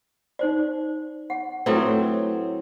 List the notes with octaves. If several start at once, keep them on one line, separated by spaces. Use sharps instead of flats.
D#4 C5 D5
F#5
A2 F#3 C4 B4